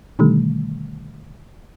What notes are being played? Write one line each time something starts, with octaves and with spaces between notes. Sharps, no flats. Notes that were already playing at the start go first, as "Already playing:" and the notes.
B2 D3 D#3 G3 A3